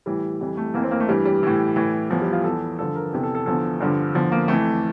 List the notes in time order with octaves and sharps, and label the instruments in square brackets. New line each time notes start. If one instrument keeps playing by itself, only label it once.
[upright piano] A2 E3 G3
F2 E3 G3
A3
F2 E3 A#3
C4
A#3
A3
G2 E3 G3
G3
A2 E3
A2 E3
E2 E3 F3
G3
F4
E2 E3 A4
G2 D3 F3 A4
A#4
E2 C3 E3 A4
A4
A4
E2 D3 F3 A4
G2 D3 F3
E2 D3 F3
A#3
F2 E3 A3